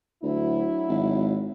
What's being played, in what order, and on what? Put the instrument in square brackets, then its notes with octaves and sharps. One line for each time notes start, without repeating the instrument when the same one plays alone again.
[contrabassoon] D2 [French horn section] F#3 E4
[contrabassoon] G#1